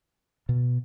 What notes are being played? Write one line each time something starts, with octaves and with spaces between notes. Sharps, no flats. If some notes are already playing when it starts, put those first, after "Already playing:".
B2